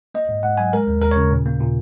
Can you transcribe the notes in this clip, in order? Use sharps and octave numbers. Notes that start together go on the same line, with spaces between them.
A#3 D#5
G#2
G#2 F#5
F#3 G#5
G#3 A#4
D#2
D#2 A#4
C#5
C#3
A#2
A#3
A#2